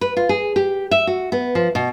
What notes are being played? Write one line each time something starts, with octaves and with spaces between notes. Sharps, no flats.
B4
F4
G#4
G4
E5
F#4
B3
F3
B2